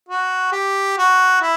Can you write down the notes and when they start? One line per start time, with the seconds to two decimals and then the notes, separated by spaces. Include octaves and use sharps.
0.08 F#4
0.52 G4
0.98 F#4
1.41 E4